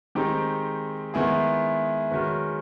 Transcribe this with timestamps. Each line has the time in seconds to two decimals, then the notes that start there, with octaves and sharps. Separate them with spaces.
0.15 D#3 G#3 C4 D#4 G4
1.14 D#3 G#3 B3 E4 G#4
2.11 D#3 G#3 C#4 F#4 B4